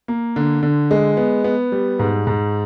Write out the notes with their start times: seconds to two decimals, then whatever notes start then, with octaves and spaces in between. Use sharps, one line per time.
0.08 A#3
0.36 D3
0.63 D3
0.91 G#3
1.17 B3
1.44 B3
1.72 G3
1.99 G#2
2.27 G#2